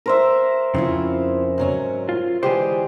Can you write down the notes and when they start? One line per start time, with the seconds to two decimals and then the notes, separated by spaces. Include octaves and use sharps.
0.06 A#4 C5 E5
0.74 F2 C#3 C4 E4 F4
1.58 G#2 F#3 C#4
2.09 F4
2.43 D3 E3 G#3 G4 G#4 C5